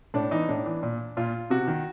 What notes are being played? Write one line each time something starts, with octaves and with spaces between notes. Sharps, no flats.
A2 D4
E3 D#4
A2 D4
E3
A#2
A#2 F4
C3 F#4
D#3